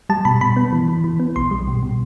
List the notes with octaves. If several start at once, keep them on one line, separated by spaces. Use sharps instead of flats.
G3 A5
B2 B5
B2 B5
B3
E3
E3
E3
B3
B1 C6
G3
B2
B2